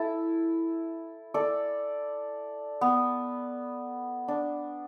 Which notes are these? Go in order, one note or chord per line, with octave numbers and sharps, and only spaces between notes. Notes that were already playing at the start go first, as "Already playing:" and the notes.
Already playing: E4 A4
A4 D5
B3
D4